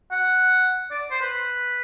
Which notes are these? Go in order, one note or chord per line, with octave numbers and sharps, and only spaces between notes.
F#5
D5
C5
B4